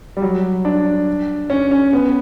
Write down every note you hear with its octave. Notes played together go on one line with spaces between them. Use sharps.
G3
F#3
D4
C#4
C#4
B3